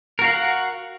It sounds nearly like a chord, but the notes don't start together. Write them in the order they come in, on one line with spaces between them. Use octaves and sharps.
A#4 F#4 F5 F#5